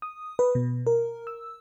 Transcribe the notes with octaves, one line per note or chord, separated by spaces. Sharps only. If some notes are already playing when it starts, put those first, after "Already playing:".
D#6
B4
B2
A#4
E6